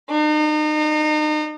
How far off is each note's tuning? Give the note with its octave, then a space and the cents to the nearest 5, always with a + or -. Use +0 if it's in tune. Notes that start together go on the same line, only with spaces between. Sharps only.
D#4 -35